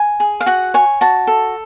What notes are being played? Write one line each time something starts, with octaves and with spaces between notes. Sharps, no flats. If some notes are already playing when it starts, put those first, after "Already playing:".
Already playing: G#5
G#4
F5
F#4 F#5
C#5 G#5
F#4 A5
A4